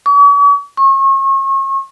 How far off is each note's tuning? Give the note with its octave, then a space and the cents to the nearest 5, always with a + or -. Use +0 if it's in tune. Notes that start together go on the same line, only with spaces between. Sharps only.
C#6 +45
C#6 -35